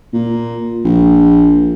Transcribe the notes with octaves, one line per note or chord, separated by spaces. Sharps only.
A#2
A#1